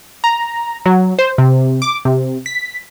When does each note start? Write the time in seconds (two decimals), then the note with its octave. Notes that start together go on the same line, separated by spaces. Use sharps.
0.24 A#5
0.86 F#3
1.19 C5
1.38 C3
1.82 D6
2.05 C3
2.46 B6